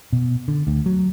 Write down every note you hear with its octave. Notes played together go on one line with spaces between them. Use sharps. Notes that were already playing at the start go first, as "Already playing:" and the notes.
B2
D3
D2
F#3